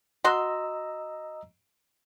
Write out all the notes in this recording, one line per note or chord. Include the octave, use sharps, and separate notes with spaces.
F#4 D#5 A#5 C6 E6